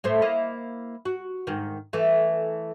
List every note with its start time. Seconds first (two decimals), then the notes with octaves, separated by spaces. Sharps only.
0.04 A2 A3 C5
0.22 A#3 E4 D#5
1.05 F#4
1.47 G#2 D#3
1.93 E3 A3